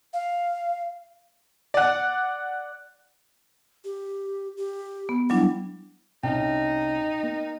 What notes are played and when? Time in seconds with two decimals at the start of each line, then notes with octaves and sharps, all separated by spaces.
0.13 F5
1.74 D5 F#5
3.85 G4
4.57 G4
5.09 B3
5.30 F#3 G3 D4 E4
6.23 C2 C#4 D#4 G5
7.23 A#3